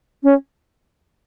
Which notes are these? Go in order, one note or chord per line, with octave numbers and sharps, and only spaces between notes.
C#4